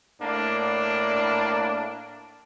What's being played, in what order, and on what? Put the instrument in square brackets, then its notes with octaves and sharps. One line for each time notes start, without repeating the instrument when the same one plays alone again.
[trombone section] A2 A#3 D4